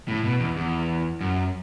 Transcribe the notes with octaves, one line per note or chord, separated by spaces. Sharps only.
A2
B2
E2
E2
F#2